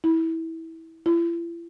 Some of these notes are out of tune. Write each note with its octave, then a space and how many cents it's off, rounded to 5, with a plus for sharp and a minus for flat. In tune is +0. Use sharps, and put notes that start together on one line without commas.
E4 -20
E4 +40